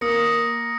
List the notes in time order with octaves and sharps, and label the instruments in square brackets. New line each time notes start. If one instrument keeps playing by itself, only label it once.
[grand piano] A#3 [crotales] D#6 A#6 C#7